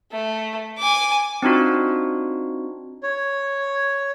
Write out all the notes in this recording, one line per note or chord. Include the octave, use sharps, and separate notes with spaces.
A3
G#5 D6
C4 D4 D#4 F4 F#4
C#5